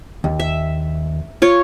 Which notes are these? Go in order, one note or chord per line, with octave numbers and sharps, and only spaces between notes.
D#2
E5
F4 C#5